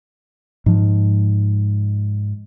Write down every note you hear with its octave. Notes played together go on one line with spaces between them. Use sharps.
G#2 F3